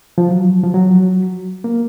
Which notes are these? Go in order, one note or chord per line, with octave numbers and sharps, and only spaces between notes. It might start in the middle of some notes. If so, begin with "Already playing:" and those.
F3
F#3
F3
F#3
A#3